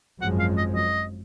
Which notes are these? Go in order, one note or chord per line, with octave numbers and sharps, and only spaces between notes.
G#1 F#2 F3 G#3 F#5
F5
D#5
D#5